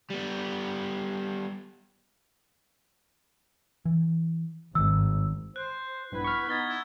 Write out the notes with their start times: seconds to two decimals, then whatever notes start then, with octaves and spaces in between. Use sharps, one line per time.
0.11 G3 B3
3.85 E3
4.75 G#1 G2 D#3 E6
5.56 C5 F#6
6.12 A#1 G2 B3 E4 B4
6.24 B5 C#6 F6
6.49 B3 D#4 G#6 A6 G7
6.68 E4